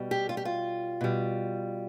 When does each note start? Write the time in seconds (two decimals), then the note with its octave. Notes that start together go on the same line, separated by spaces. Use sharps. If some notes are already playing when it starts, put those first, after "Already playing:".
Already playing: B2 G3
0.11 G4
0.29 F4
0.37 G4
0.45 F4
1.01 B2 G3